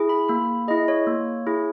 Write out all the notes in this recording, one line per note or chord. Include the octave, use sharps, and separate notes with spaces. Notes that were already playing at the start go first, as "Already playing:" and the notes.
Already playing: E4 G#4
B5
A#3 B5
E4 G#4 D#5
C#5
A#3
E4 G#4